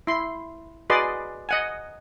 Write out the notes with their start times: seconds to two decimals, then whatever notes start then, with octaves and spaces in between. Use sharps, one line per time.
0.07 E4 C6
0.90 F#4 G#4 B4 D5 D#5 C6
1.49 D#5 F#5 G#5